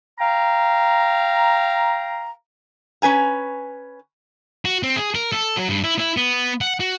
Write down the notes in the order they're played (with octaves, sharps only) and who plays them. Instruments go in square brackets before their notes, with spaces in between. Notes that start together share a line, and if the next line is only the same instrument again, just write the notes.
[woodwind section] F5 G5 A#5
[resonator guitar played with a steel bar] C#4 B4 G#5 A#5
[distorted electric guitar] F#4
C4
G#4
A#4
A4
F#3
G2
E4
E4
B3
F#5
F#4